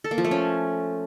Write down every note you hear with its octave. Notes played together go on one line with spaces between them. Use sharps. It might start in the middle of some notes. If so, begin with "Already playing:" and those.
A4
A#3
F3
A3
C#4